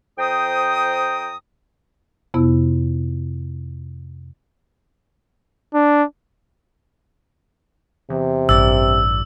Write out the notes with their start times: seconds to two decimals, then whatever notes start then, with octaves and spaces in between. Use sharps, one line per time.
0.18 F2 C5 G5 A#5 D#6
2.34 F2 C3 B3 E4
5.74 D4
8.10 E2 C3
8.49 A1 G2 D5 E6